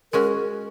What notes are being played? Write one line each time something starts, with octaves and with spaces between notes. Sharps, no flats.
G#3 C#4 F#4 A#4